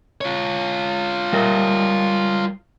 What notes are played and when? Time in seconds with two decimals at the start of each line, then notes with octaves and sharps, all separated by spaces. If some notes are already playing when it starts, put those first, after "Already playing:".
0.21 F4 C#5
1.33 G3 A#4 D#5